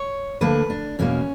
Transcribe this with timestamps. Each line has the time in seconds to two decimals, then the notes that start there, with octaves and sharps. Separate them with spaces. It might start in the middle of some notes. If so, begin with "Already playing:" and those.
Already playing: C#5
0.41 D2 D3 A#3 B4
0.70 D4
0.99 E2 B2 A#3 C#4